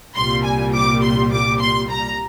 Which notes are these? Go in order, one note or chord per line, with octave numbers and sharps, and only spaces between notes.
C2 A#2 G3 C6
G#5
D6
C6
D6
C6
A#5